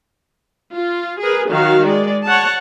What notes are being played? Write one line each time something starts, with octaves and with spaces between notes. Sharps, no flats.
F4
G#4 A#4 B4
D#3 F#3 F#4 F5
G#3 D5
C#5 F#5 A5